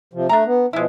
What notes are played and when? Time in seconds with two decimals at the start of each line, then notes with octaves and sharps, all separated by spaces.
0.13 C3 F3
0.29 A3 D4 A#5
0.46 B3
0.73 B2 F3 G#3 E4